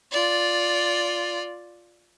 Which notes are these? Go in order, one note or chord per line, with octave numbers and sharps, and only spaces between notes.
F4 D5